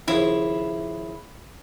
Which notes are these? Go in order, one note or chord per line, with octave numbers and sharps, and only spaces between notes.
D#2 C#3 F3 E4